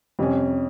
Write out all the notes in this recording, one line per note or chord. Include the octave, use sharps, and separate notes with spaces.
F2 C3 G3 C#4